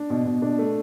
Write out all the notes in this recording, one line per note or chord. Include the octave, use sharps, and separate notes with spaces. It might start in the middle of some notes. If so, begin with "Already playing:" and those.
Already playing: D4
B2
B2
D4
A3